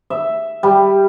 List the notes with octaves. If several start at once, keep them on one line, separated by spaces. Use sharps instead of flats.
E5
G3